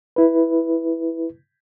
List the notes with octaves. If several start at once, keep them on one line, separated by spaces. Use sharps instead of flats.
E4 B4